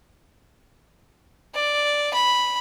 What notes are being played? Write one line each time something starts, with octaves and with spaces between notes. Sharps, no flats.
D5
B5